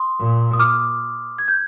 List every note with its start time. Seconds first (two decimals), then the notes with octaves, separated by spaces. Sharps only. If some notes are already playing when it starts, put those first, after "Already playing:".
Already playing: C6 D#6
0.20 A#2
0.53 D#6
0.59 D6 F6
1.38 G#6
1.48 G6